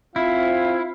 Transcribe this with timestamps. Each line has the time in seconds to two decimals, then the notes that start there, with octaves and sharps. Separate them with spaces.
0.16 C4 E4 F4 F5